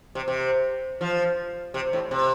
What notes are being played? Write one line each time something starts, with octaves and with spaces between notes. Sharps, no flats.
C3
C3
F3
C3
A2
C3